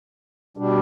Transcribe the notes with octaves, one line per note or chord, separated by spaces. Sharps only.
B2 G3 D4